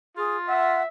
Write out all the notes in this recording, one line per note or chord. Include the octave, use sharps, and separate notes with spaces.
F4 G#4
E5 F#5